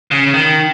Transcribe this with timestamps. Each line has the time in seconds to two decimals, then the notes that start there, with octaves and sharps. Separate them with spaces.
0.11 C#3
0.34 D#3